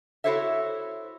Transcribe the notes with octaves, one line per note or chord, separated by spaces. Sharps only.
E4 F#4 A4 C5 C#5 E5